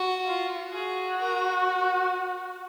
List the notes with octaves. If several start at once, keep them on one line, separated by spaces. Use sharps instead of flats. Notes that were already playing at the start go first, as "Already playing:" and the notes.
Already playing: F#4
F4
F#4 G#4
A#4